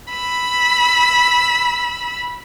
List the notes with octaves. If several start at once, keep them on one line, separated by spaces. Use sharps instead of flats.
B5 E6